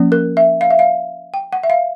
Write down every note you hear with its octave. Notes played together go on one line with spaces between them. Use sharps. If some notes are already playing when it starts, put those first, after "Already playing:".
Already playing: F3 A#3 C#4
A#4
E5
F5
E5
F5
G5
F#5
E5
F5